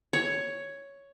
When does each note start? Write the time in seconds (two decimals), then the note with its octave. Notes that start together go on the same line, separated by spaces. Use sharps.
0.13 C#5